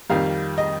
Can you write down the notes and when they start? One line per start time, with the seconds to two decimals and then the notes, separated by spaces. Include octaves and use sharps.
0.10 F2 D#3 G3 F5
0.58 D#5